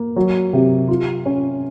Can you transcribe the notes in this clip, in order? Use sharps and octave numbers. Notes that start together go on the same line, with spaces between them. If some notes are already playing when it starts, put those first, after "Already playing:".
Already playing: A#3
F#3
C3
F4
C#4